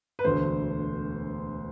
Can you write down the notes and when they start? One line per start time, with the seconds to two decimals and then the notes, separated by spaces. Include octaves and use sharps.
0.19 B4
0.24 E1 D2 D3 A3 C5